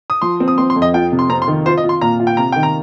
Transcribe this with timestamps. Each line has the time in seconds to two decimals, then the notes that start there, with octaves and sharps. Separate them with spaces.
0.10 D#6
0.22 F3 C6
0.40 C4
0.48 D#6
0.58 C4 C6
0.70 C6
0.76 F2
0.82 D#5
0.94 F4 G5
1.12 C3
1.19 C6
1.30 C4 A#5
1.42 C6
1.48 D#3
1.66 F4 C5
1.78 D#5
1.84 F4
1.89 C6
2.01 A#2 A#5
2.20 F4
2.27 G5
2.37 C3 A#5
2.52 D#3 G5
2.63 A#5